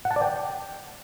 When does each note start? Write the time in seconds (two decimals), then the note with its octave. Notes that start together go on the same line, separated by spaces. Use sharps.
0.05 F#5
0.11 A5
0.16 D5
0.22 G5